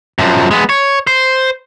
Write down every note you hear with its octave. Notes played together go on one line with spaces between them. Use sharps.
F#2 F3
G#3 B3
C#5
C5